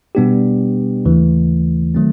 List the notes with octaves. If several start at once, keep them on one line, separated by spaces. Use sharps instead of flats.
B2 G3 B3 D4 G4
D#2 C#3 E3 A3
D#3 F#3 A3 C4